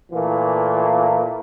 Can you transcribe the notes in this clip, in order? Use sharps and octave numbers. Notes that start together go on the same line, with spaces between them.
A#2 E3 A3 A#3